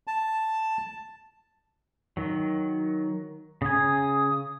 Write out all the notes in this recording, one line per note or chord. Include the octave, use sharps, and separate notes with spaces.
A5
D#3 F#3
C#3 G#5 D#6